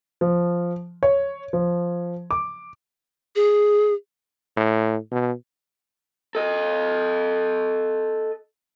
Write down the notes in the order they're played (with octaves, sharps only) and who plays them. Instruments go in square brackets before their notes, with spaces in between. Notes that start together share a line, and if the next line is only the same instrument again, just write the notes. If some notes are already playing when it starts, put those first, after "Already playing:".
[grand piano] F3
C#5
F3
D6
[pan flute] G#4
[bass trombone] A2
B2
[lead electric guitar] A4 D#5